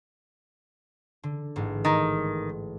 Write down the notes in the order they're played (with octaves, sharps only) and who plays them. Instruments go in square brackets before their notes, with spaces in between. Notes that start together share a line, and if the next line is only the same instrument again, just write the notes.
[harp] D3
A1 G#2
[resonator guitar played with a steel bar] D#3